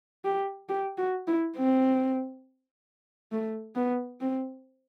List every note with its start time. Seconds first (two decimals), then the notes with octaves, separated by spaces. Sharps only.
0.25 G4
0.69 G4
0.98 F#4
1.27 E4
1.57 C4
3.32 A3
3.75 B3
4.21 C4